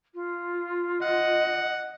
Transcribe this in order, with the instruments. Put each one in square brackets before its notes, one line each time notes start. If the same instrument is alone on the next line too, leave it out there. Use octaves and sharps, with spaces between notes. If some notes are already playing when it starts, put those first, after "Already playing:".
[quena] F4
[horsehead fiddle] D#5 [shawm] F#5